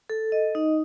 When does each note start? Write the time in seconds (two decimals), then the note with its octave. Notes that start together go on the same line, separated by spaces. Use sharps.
0.10 A4
0.32 D#5
0.55 D#4